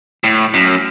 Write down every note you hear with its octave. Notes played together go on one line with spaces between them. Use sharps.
A2
F#2